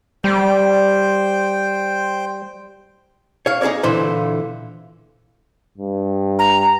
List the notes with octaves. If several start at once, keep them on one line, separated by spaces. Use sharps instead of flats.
G3 C5 G5
C#5 F5
D#4 G#4 A#4 C#5 D5
A#2 D3 E3 E4 C5
G2
A#5